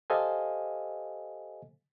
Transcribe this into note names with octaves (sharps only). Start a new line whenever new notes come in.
G4 A4 C5 D#5 F5 G#5